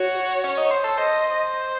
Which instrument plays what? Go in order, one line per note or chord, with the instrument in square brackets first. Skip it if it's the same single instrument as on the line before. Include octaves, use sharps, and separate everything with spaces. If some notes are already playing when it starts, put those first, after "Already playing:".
Already playing: [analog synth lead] F#4 [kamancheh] C#5
[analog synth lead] C#4
D#4
C5
A4
[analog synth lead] C5 [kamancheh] D#5